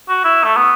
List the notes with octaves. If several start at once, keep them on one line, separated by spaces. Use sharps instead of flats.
F#4
E4
A3
B3